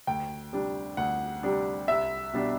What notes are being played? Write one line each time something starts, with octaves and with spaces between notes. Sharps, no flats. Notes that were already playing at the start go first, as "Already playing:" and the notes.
D2 G5
C3 G3 D4
D2 F#5
C3 G3 D4
C2 E5
B2 G3 D4